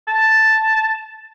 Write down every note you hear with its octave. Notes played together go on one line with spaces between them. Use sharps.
A5